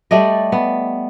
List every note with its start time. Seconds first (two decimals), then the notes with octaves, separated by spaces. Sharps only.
0.11 G3 A3 D5 D#5
0.52 B3